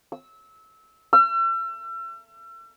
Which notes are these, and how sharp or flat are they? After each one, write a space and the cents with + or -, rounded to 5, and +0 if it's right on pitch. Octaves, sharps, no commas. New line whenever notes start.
E6 -20
E6 +40